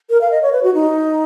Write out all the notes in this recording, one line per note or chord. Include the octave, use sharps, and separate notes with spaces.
A#4
F5
D#5
C#5
B4
F#4
D#4